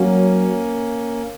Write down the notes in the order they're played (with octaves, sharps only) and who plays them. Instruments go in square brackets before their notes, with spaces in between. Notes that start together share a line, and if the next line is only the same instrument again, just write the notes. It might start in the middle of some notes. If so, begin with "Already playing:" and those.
Already playing: [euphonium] F#3 [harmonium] A#3 C#4